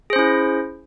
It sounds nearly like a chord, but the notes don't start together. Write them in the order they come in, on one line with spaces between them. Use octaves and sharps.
G#4 C5 C#4 E4